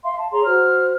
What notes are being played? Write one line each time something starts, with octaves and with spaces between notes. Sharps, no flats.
E5 F5 C6
A5
G#4 C#5 A#5 C6
F#4 C5 F6